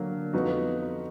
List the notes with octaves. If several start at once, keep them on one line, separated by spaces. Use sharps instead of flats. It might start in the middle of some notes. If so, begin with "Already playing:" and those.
Already playing: D3 F#3 A#3 D4
F2 F3 B3 D#4 F#4